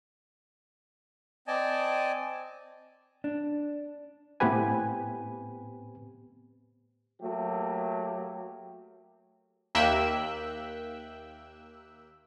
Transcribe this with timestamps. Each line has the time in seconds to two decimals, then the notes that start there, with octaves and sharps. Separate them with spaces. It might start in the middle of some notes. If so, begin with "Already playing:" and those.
1.48 C4 D5 D#5 G#5 A5
3.24 D4
4.40 A2 B3 C4 G4 B4 G#5
7.22 F#3 A3 A#3 G4
9.75 D#2 A#3 E5 G5 E6 F#6